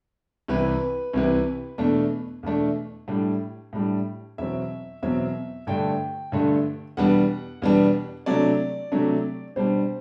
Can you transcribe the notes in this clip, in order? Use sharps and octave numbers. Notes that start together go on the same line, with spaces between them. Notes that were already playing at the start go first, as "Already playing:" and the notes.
C2 C3 E3 B4
C2 C3 E3
E2 B2 A3 D4
E2 B2 A3 D4
A2 G3 D4
A2 G3 D4
E2 B2 F#3 C4 E5
E2 B2 F#3 C4 E5
G2 D3 A3 D4 G5
G2 D3 A3 D4
E2 B2 G3 B3 D4 F#5
E2 B2 G3 B3 D4
C3 F#3 A3 D4 D5
C3 F#3 A3 D4
B2 G3 D4 C5